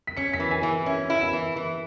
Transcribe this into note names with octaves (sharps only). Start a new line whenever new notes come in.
B6
C#4 C#7
B6
E3
G#5
E3
C#4 E5
E4
E5
E3
E3